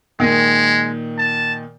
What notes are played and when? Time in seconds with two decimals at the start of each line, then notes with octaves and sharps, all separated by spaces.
0.20 A#2 D#3 G#3
1.18 A5